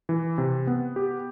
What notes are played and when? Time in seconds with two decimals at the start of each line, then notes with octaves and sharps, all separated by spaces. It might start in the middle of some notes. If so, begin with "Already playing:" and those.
0.09 E3
0.38 C3
0.67 B3
0.96 G4